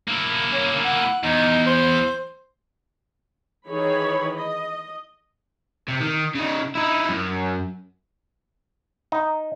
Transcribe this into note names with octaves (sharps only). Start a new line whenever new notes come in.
A#3 E4
C#4
F#5
E2 D#4
C5
D#3 E3 D#4 G#4 C#5 B5
D#5
C3
D#3
C#3 D#4
D#4 E4
F#2
D#4